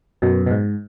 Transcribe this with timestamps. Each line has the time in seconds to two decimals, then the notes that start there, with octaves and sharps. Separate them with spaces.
0.22 F#2 B2
0.46 B2
0.51 G#2